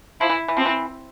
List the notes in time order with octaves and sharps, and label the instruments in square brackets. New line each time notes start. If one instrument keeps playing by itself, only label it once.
[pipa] F3 [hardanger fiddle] E4
[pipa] E3
E3
[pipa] F3 [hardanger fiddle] C4
[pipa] E3